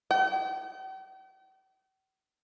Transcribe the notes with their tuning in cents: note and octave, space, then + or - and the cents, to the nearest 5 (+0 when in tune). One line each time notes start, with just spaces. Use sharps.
G5 -45